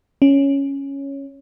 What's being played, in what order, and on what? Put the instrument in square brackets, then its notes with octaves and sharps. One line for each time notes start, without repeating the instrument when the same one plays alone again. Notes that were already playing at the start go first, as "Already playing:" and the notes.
[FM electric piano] C#4